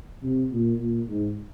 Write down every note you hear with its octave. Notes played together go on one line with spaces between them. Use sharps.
C3
A#2
A#2
G#2